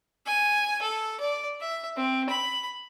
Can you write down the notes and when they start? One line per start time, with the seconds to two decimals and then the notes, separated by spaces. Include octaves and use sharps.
0.26 G#5
0.82 A4
1.20 D5
1.61 E5
1.97 C4
2.30 B5